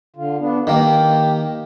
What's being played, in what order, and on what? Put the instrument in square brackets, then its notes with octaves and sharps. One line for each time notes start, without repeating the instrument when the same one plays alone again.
[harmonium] D3 F4
B3 D4
[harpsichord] D#3 A#3 [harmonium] G4